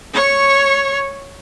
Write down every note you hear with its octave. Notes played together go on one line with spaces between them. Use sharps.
C#5 C#6